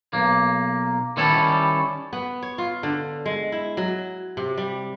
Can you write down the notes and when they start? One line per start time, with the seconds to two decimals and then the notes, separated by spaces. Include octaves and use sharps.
0.13 B1 A#3
1.17 D#3 G3 C#4 E4 A4
2.13 B3
2.42 C#5
2.58 F4
2.83 D3
3.25 G#3
3.52 E4
3.77 F#3
4.37 C3
4.57 G3